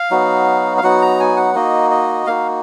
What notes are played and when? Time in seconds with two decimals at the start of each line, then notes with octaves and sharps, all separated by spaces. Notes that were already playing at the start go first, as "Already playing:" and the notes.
Already playing: F5
0.11 F#3 B3 D#4 F#4
0.77 F5
0.83 F#3 B3 D#4 F#4 F#5
1.02 A#5
1.20 G#5
1.37 F#5
1.55 A#3 D#4 F#4 D#5
1.91 D#5
2.26 A#3 D#4 F#4 F5